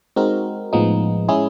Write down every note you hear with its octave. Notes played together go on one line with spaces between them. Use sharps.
G#3 C4 D#4 F#4 A#4
A2 F3 G#3 B3 D#4
G#3 C#4 E4 G#4